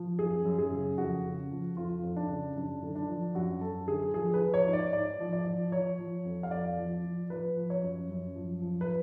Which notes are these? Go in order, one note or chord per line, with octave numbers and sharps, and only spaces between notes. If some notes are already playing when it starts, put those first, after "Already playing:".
Already playing: F3
F#2 G#4
F#2
G#4
C#3
F2 F#4
C#3
F3
F2 F4
F2
D4
C#3
F#2 D4
D3
D4
F3
F#2 F#4
F#2 A4
D3 G#4
F3 G#4
B4
F3
C#5
G#2
D5
G#2 D5
F3
D5
F3
F3 C#5
F3
F2
F5
F2 D5
F3
F3
F3 B4
F3
C#5
F#2
F#2
F3
F3
B4